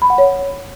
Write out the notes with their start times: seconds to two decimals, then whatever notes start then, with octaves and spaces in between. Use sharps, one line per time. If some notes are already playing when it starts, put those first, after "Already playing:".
0.02 B5
0.10 F#5
0.18 C#5